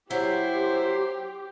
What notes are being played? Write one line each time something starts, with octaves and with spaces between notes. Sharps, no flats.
F#3 E4 G4 C5